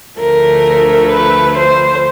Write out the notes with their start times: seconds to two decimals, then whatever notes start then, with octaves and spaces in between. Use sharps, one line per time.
0.19 D2 D3 F3 A3 A#4
1.11 B4
1.57 C5